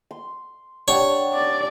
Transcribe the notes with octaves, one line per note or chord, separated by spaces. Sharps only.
C6
D4 G4 C#5 F#5
D5